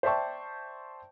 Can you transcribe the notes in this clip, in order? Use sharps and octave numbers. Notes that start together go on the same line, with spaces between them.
C5 D5 E5 G5 A5 C#6